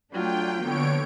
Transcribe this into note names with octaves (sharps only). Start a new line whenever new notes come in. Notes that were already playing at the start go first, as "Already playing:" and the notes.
F#3 A3 D4 F4 G5
D3 F3 A#3 B3 C#5 D7